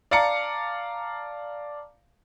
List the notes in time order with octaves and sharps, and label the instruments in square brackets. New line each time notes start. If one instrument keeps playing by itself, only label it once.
[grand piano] D5 F5 A5 A#5 D6 C#7